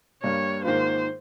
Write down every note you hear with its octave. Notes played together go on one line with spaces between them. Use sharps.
G2 G3 A#3 C#5
G#2 D#3 A#3 F4 C5